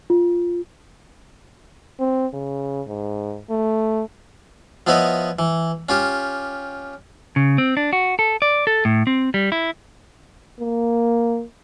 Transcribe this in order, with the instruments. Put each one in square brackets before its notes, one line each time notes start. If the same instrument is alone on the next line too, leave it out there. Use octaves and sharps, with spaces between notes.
[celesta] F4
[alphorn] C4
C#3
G#2
A3
[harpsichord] F3 B3 E4 B4 C#5 D#5
E3
C#4 F4 G4
[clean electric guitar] C#3
C4
D4
F#4
A4
D5
A4
A2
C4
G3
E4
[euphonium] A#3